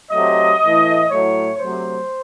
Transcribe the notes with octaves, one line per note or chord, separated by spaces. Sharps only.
C3 F#3 A3 D#5
A2 E3 A3
A2 F#3 A3 C#5
C3 F#3 A3 C5